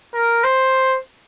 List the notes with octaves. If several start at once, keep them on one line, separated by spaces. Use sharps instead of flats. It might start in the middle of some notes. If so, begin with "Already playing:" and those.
A#4
C5